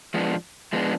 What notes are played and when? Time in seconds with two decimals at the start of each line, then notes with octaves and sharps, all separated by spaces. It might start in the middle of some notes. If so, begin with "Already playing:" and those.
0.14 F3 G#3 B3 D4
0.73 F3 G#3 B3 D4